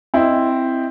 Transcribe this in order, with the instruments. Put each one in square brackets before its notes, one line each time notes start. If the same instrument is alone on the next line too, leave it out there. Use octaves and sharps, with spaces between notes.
[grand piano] C4 E4 D#5